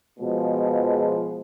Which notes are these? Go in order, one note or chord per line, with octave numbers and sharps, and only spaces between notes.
B2 F3 G#3